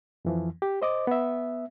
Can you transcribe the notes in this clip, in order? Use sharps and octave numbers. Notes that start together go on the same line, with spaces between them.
F2 E3 F3
G4
C5 D#5 D6
B3 E5